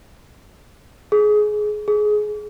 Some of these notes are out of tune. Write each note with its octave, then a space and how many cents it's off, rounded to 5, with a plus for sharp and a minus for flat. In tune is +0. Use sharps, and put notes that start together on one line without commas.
G#4 +20
G#4 +20